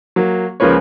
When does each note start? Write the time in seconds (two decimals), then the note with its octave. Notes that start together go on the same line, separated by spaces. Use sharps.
0.16 F#3 A#3
0.60 C#2 C#3 F3 A#3 B4 C#5